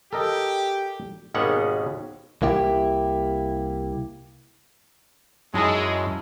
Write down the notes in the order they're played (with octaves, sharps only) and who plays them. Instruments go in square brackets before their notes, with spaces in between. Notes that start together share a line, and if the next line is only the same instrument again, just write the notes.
[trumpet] G4 [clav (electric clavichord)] A4 A#4 D#5
[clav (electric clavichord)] G#1 D#2 B2 G#3 C#4 F#5
[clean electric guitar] C2 A#3 E4 G4
[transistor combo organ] F#2 [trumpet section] G#3 [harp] D#4 E4 A5